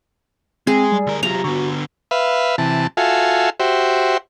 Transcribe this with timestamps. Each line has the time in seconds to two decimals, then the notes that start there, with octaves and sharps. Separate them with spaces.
0.67 G#3 C4 G#4
0.92 G3
1.07 D2 A#4
1.23 C3 F#3 F4 A#5
1.44 D3 B3 F#4
2.11 B4 E5 F5
2.58 C3 E3 A5
2.97 F4 F#4 A4 E5 F5 G#5
3.60 F#4 G4 C5 E5